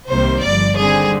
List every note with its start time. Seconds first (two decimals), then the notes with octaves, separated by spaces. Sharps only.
0.09 C2 C3 D#3 G3 A#3 C5
0.43 G1 G2 F3 D5
0.77 D#2 D3 G3 C4 G#4